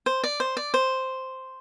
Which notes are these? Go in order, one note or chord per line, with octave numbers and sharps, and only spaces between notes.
C5
D5
C5
D5
C5